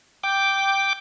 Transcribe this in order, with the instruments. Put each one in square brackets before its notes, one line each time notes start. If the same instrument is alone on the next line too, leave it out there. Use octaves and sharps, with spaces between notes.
[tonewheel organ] G5 D6